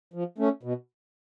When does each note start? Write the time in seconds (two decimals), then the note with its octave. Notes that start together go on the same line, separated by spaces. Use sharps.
0.14 F3
0.38 A3 C#4
0.63 B2